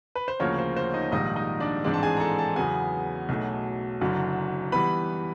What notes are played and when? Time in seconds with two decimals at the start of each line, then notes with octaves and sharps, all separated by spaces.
0.16 B4
0.28 C5
0.40 D2 C#3 F3 A#3 C#4 C#5
0.59 C5
0.77 C5
0.94 D#4 D#5
1.12 A#1 G#2 D#3 G3 A#3 D#4 D#5
1.36 D#4 D#5
1.60 D4 D5
1.84 A1 G#2 E3 G#3 C4 D4 D5
1.94 A5
2.03 G#4 G#5
2.17 A#5
2.20 A4 A5
2.38 A4 A5
2.56 E2 C#3 F#3 B3 G#4 G#5
3.29 B1 B2 F#3 A3
4.01 F#1 F#2 D3 F#3
4.72 E3 G3 B3 B4 B5